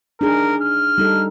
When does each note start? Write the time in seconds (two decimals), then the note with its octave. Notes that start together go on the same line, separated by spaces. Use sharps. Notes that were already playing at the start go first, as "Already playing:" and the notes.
0.21 D4 D#4 G#4 A#4
0.62 F6
0.98 G3 D#4 A4